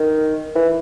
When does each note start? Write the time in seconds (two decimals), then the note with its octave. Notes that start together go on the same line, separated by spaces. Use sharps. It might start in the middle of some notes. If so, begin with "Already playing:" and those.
Already playing: D#3
0.56 E3